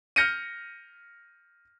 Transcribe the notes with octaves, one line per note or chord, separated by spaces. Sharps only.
F6 G6 A#6 C#7 D#7